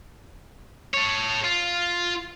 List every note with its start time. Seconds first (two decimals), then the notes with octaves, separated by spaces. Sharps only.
0.94 A4 C#5
1.44 F4